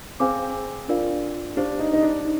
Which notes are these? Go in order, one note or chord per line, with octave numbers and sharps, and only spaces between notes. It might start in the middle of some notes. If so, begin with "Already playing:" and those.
C4 G#4 C5 F5 G#5 D6
D4 F4 A#4 D5 F5
D4 G4 C5 F5
D#4
D#4
D4
D#4